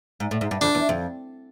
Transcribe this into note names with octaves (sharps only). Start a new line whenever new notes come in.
G#2
A2
G#2
G2
F2 D4
E2
F2